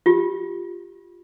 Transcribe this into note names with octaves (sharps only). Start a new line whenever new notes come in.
F4 G4